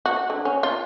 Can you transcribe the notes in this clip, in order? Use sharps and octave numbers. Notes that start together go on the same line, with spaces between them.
F#4
D3
C#4
F4